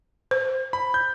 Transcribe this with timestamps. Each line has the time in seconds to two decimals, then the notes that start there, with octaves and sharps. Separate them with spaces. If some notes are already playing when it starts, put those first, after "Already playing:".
0.31 C5
0.73 B5
0.94 G6